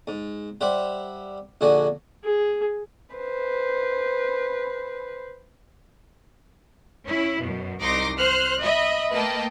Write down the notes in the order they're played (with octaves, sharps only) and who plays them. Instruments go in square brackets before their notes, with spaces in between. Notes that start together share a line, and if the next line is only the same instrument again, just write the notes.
[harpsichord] G#2
G3 C5 E5 F#5
A#1 D3 F#4 G#5
[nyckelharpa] G#4
[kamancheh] B4 C5
[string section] C#4 E4
F#2 B2
C2 D#4 C6 D6 A#6
C5 F6 F#6
D#5 E5 B5
A3 A#3 B4 D#5 G5 A5